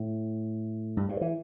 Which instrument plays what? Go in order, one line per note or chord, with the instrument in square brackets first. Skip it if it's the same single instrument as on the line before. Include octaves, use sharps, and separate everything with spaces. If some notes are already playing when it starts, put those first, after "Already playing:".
Already playing: [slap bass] A2
G2
G2
E3